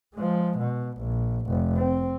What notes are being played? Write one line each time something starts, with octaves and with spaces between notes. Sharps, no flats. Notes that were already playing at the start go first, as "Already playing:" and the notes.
F3 G#3
B2
A#1
F1
C4